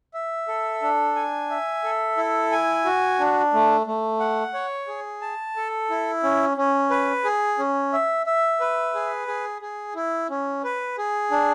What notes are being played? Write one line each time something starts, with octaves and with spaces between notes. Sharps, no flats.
E5
A4
D4
G#5
E5
A4
E4
G#5
F#4
D4
A3
A3
F#5
C#5
G#4
A5
A4
E4
C#4
C#4
B4
G#4
C#4
E5
E5
B4
G#4
G#4
G#4
E4
C#4
B4
G#4
D4